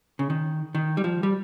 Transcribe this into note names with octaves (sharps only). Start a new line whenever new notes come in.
C#3
D#3
D#3
G3
F3
G3